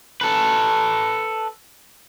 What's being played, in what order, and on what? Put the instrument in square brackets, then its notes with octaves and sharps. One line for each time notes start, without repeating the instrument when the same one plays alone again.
[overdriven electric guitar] A4 B4